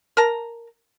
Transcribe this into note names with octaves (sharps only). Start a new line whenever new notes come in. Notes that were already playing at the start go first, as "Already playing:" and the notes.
A#4 A5 A#5